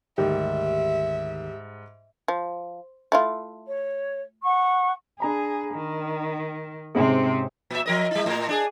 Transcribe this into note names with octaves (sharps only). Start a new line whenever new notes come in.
D2 G#2 D#3 G3 G4 E5
F3
A3 E4 F4
C#5
F#5 C#6
D4 G#4 A#5 B5
D#3
G#2 C3 C4 C#4 G#4
A#2 E5
F3 A#4 D#5
G3 E4
A2 A#4
D4 G#4